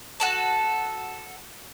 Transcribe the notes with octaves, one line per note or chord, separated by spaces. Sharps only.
F#4 A4 A5